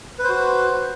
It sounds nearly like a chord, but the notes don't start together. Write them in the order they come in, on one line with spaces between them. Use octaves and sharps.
B4 C5 F#4